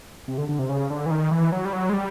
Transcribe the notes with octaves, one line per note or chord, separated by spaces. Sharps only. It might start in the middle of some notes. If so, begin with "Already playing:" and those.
C3
D3
D3
C3
C#3
D3
E3
D#3
E3
F#3
G3
F#3
G#3
G3